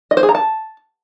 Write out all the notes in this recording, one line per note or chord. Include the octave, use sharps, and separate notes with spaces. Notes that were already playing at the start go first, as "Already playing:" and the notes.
D#5
C5
G#4
A#5
A5